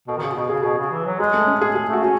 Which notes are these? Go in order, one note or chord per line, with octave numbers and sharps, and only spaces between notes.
B2 A4
D#3
C#3 F#4
B2 F#4
C#3 G#4
B2 G#4
C#3
E3
F#3
G#3 G#4
A3
C#4
G#4
G#4
A3 F#4
C#4 F#4